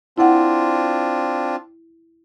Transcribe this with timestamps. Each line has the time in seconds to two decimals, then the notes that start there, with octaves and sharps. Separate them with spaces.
0.18 C4 D4 E4 F4 F#5